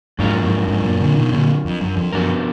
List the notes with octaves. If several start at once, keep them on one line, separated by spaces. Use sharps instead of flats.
F2 G#2 F#3 D4 F4 A#4
F2 G#2
F2 G#2
F#2 A#2
A#2 D3
B2 D#3
A#2 D3
F2
F#2
F2
F#2 F3 B3 D4 F#4 A#4